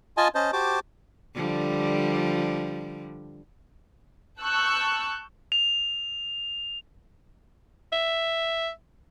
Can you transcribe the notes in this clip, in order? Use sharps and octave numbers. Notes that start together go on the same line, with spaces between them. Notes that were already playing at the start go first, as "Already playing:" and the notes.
F4 D#5 G#5 A5
C#4 C5 D#5 A5
F#4 G4 C5 A5 D6
D3 F3 G3
A5 C#6 E6 F#6 G6
F7
E5